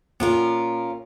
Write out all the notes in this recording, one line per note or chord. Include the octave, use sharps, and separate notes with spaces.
A#2 A#3 C#4 F4 A#4